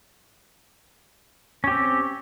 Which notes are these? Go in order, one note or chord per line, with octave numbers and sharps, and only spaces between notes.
C4 C#4 G4